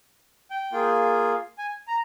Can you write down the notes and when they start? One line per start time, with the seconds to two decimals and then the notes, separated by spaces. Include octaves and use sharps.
0.51 G5
0.72 A#3 F4 G#4
1.58 G#5
1.88 A#5